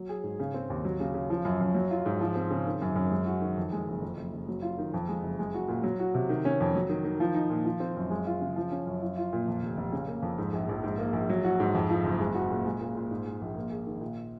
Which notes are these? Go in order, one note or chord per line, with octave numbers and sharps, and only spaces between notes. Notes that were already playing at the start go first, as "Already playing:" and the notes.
Already playing: F#3
G#4
G#2
C#3
C4
D#2
F#3
C#3
C#3
F3
F#2
F#2
F#3
F4
G#2
F3
C4
C#3
D#3
F#2
F#2
G#3
F#4
D#3
F2
G#3
F#1
F2
F#1
F#1
F#3
F4
D#3
F2
G#3
F#1
G#3
F#4
A#2
F#3
F#4
C3
D#3
C#4
F2
F#3
D#3
D#3
F3
D#4
A#2
F3
C4
F#2
G#3
F4
C#3
F3
C#4
F#2
F3
F4
A#2
F2
F1
F1
C#3
A#3
F2
G#2
A#1
A#1
G#2
A#3
A#1
F#3
F#4
G#2
F2
F3
F#1
G#3
F#4
A#2
G#3
A#2
A#2
G#2
G#3
A#1
A#3
G#4
D#3
A#2